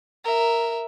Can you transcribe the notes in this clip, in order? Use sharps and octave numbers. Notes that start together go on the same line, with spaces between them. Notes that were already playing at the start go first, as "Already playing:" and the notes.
A#4 E5